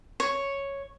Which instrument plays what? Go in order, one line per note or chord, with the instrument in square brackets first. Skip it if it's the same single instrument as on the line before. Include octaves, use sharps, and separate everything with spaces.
[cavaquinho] C#5